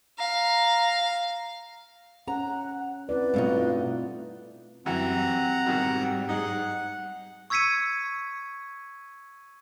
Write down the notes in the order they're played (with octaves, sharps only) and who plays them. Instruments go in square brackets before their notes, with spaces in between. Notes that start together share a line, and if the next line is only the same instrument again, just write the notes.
[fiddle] F5 [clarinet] A#5
[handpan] C#4 [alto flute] F#5 [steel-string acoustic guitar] A#5
[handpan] C4 E4 D5 [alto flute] B4
[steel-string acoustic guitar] G2 B2 D#4 [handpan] A3 C4 F4
[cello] F#2 G3 [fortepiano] E3 F#4 [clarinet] C4 [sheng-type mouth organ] F#5 A#5
[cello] G#2 G3 [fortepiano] B2 D#3 F#4
[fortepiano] D#4 G#4 [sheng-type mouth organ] F#5
[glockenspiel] C#6 E6 G#6 B6 C#7 D#7